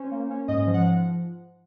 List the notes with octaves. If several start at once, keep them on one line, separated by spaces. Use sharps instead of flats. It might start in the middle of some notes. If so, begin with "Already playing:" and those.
Already playing: C#4 C5
A#3
C#4
G#2 D#5
F3
F#5